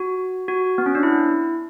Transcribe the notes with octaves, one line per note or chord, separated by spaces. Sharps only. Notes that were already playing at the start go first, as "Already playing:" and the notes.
Already playing: F#4
F#4
B3
C#4
D4
E4